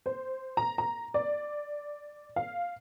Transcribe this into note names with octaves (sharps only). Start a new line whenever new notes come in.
C5
A#5
A#5
D5
F5